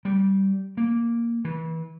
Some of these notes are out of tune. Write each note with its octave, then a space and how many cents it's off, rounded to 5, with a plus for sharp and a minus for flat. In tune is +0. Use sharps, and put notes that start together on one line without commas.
G3 -15
A#3 +0
E3 -30